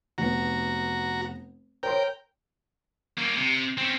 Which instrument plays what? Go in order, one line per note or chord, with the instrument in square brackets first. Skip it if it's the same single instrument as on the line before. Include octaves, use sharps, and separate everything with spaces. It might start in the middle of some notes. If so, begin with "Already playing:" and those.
[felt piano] F1 B3 [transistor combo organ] F#4 A#5
[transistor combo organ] A#4 G5 [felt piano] C5 C#5 C6
[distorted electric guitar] A#3 C#4
C3
C4 C#4